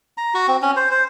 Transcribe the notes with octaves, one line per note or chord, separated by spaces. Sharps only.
A#5
F#4
C4
C#4
C5
C5